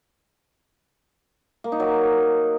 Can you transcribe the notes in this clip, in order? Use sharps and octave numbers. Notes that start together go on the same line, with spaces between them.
A#3
D#4
F#3